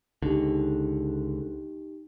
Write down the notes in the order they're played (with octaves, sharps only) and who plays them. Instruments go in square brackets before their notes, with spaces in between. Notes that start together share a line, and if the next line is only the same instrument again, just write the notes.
[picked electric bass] C#2 D3 [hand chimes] D#4 G4